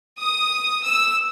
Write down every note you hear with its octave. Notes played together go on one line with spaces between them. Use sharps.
D#6
E6